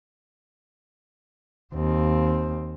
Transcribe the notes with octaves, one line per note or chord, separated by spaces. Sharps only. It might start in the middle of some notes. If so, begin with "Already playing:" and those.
D#2 C4